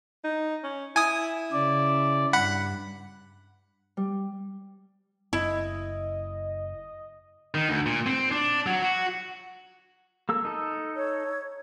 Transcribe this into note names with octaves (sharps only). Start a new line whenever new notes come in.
D#4
C#4
E4 G#5 D#6
C#3 D5
G2 F#5 B5
G3
F#1 E4 D#5
D#3
D2
A#2
C4
D4
F#3
F#4
A#3 A4 E6
D#4 A4
C#5